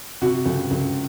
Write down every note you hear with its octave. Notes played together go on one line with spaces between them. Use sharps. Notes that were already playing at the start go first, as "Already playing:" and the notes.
C3 F#4
C#2
C#2